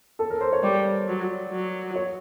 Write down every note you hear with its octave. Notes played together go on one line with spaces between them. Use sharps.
A4
A#4
C5
C#5
G3 D5
F#3
F#3
C#5